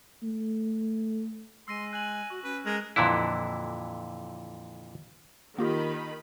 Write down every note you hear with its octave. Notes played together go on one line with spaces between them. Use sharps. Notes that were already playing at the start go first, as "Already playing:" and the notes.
A3
G#3 C6 E6 A#6 D#7
G#5 F#6 F#7
F#4 C#6 F#7
C#4 B4
G#3 A#4
F2 A#2 D3 E3 E4
D#3 A#3 F4 G4 B5